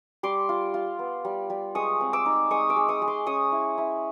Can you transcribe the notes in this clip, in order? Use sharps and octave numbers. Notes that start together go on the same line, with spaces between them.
G3 C6 D6
F4
F4
B3
G3
G3
G#3 C#6 D#6
C4
D6 E6
D#4
G#3 C#6 D#6
D6 E6
G#3
C#6 D#6
G#3
C6 D6
C#4 C#6 D#6
E4
E4